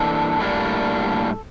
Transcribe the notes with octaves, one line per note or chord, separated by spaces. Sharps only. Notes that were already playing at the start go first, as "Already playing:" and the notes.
Already playing: E3 A#3 D4 A4
A2 G3 A#3 D4